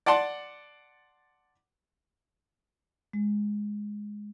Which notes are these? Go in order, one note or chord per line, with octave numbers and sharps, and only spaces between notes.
D5 F#5 A5 C6
G#3